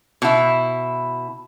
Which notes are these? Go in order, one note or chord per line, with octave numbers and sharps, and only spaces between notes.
B2 E4